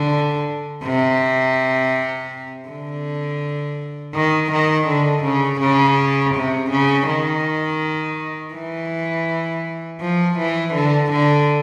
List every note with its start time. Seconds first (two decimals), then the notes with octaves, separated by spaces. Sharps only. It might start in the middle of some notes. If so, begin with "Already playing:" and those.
Already playing: D3
0.84 C3
2.68 D3
4.15 D#3
4.51 D#3
4.88 D3
5.24 C#3
5.61 C#3
6.35 C3
6.71 C#3
7.07 D#3
8.54 E3
10.01 F3
10.38 E3
10.74 D3
11.12 D3